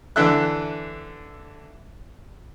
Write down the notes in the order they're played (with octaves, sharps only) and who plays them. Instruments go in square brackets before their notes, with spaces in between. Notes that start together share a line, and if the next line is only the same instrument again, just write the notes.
[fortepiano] D3 E3 D4 A4 E5 F#6